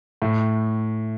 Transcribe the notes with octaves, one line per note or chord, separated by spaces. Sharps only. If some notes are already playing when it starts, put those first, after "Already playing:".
A2